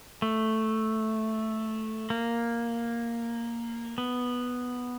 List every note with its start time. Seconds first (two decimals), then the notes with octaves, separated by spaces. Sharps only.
0.22 A3
2.10 A#3
3.98 B3